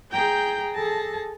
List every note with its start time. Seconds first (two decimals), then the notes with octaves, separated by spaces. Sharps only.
0.11 G#4 G5 A#5 G6
0.73 G#4 A4 A5 A#6